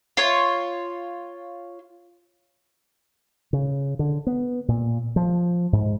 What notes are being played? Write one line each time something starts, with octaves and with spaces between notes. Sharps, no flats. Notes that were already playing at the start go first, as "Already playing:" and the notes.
F4 C#5
C#3
D3
B3
A#2
F3
G#2